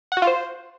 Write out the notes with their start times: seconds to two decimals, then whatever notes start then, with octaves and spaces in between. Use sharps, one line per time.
0.12 F#5
0.17 F#4
0.22 F4
0.27 C5